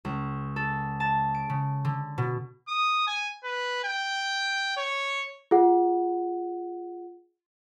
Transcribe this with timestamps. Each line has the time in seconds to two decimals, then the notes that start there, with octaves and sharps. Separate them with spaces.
0.05 C#2
0.56 A4
1.00 A5
1.34 D7
1.50 C#3
1.85 D3
2.18 B2
2.68 D#6
3.07 G#5
3.44 B4
3.84 G5
4.77 C#5
5.51 F4 G#4 F#5